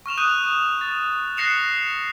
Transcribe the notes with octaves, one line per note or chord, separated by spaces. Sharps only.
C#6 F6 E7 F7
D#6 F#6 G6 D#7
A6
F#6 A#6 C7 C#7 E7 F7